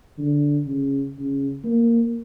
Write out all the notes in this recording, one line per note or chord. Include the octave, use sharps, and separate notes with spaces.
D3
C#3
C#3
A#3